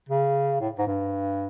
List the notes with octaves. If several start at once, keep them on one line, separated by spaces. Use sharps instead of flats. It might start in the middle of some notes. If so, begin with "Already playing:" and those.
C#3
A2
G#2
G2